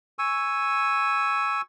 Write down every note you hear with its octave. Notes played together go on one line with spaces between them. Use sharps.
G#5 C#6 E6